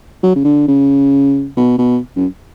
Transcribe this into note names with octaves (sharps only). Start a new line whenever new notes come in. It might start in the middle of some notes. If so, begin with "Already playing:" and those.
F#3
C#3
D3
C#3
B2
B2
F#2